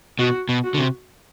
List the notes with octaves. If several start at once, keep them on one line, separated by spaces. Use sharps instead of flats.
B2 F#4
B2
F#4
D3
C3